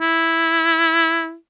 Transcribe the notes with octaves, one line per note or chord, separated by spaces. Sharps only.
E4